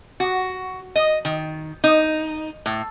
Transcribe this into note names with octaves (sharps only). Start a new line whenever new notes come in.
F#4
D#5
D#3
D#4
A2